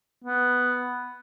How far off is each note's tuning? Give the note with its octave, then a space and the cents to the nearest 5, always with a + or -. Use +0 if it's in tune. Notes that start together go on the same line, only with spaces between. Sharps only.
B3 +0